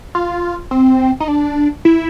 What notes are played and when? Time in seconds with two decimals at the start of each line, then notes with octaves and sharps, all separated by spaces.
0.15 F4
0.71 C4
1.20 D#4
1.28 D4
1.85 E4